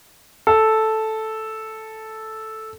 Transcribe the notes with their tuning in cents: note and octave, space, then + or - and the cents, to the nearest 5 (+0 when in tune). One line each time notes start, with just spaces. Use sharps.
A4 -5